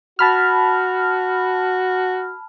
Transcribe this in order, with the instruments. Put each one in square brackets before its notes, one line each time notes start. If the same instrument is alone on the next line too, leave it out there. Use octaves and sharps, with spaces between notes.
[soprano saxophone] F#4 [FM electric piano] A5 B5 F6